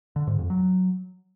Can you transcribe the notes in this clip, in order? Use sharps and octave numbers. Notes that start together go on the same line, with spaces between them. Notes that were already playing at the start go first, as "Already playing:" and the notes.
D3
G#2
F2
F#3